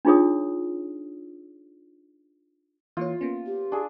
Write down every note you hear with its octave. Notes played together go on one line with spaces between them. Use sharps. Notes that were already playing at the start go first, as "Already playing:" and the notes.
D4 D#4 F4 G#4 C#5 D#6
E3 A#3 F4 C#5
A#3 B3 C#4
G4
D4 G#4